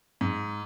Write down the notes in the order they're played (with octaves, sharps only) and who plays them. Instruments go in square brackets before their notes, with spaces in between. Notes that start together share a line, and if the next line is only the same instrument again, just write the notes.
[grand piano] G#2